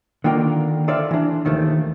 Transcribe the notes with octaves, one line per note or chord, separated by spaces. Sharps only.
D3 D#3 A#3 F4 A#4 G5
A4 C5 D5 E5 F5
E3 D4
D#2 D#3 F3 A3